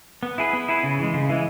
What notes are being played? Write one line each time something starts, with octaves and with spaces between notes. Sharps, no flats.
B3
E4 G#4 B4
B3
E4 G#4 B4
C#3
E3 G#3
C#3
E3 G#3